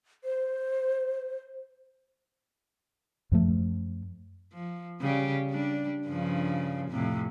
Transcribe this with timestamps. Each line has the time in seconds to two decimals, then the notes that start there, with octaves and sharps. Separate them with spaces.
0.24 C5
3.32 F#2 F3 A3
4.53 F3
5.01 C#3 G3 G4
5.51 G3 D4
6.07 G2 C#3 F3
6.89 F2 A2 C3